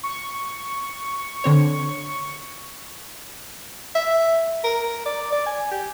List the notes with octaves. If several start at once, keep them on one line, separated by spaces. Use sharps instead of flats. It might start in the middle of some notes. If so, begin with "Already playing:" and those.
C#6
D3 C4 C#5
E5
A#4
D5
D5
G#5
G4